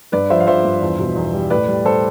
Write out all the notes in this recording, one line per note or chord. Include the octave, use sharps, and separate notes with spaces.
G2 B4 D5
F3 C5 E5
F5
F3 C5 E5
G2
E2
B2
E2
G3
A2 B4 D5
G3
G3 A4 C5